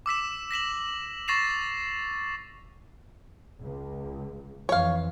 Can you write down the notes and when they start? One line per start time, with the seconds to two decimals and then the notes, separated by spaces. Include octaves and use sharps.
0.06 D6 E6 B6 E7
0.51 A#6 B6 E7 F#7
1.28 C#6 A6 A#6 C7 E7 F7
3.62 C#2
4.69 F2 E3 C#5 F5